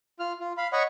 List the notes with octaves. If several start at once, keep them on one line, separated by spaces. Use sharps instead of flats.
F4 F6
F4
F5 B5
C#5 D#5 F#5 B5 C#6